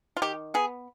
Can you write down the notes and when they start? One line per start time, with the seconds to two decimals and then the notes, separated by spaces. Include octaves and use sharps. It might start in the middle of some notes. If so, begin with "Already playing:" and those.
0.17 F4
0.22 D#3 G4
0.54 B3 G#4